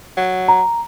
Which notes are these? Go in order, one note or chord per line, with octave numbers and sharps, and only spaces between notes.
F#3
A#5